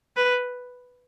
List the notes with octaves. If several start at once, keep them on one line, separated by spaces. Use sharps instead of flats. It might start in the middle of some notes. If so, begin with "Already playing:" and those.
B4